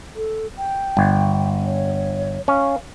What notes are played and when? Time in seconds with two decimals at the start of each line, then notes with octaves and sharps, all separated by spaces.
0.16 A4
0.57 G5
0.97 G1
1.65 C#5
2.48 C#4 F5